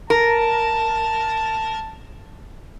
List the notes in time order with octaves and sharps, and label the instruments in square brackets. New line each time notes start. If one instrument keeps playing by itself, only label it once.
[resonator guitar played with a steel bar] A#4 [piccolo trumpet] A5